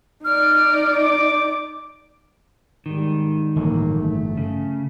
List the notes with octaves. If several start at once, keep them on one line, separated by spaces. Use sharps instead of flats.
D#4 D5 F6
D6
G#2 D#3 G3
G1 A2 E3 F#3 A#3
A3
C#3